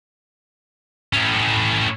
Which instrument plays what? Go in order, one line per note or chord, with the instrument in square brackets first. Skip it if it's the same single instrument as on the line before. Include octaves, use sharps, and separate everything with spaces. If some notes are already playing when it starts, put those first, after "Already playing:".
[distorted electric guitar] A2 C#4